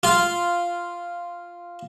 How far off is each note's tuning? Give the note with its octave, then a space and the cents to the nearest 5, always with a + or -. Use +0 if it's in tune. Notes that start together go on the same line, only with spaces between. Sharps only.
F4 -5